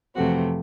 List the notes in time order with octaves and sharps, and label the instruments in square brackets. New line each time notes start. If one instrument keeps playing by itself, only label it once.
[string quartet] F2 C3 E3 A3 C4 F#4